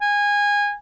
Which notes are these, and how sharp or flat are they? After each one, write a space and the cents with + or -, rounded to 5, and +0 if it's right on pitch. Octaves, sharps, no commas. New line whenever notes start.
G#5 -20